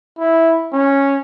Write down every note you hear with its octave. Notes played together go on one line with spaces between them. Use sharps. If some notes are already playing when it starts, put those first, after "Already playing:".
E4
C#4